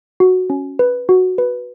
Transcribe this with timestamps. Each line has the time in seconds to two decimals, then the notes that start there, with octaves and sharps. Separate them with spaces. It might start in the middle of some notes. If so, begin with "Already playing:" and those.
0.20 F#4
0.50 C#4
0.79 B4
1.09 F#4
1.38 B4